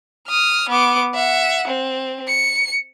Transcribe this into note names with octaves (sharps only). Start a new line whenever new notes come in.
D#6 F6
B3 D6
E5 F#5
C4
C#7